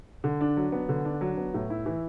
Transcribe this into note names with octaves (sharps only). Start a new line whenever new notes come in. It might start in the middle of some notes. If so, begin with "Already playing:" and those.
D3
D4
F#3
B3
D3
D4
F#3
B3
A2
E4
E3